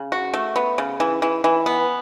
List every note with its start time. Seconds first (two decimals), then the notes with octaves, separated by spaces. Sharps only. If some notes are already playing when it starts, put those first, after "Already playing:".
Already playing: C#3
0.12 F#4
0.34 A3
0.56 B3
0.78 C#3
1.00 E3
1.22 E3
1.44 E3
1.66 B3